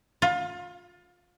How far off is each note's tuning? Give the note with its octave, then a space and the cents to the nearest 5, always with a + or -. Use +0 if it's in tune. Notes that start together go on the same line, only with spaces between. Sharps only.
F4 +25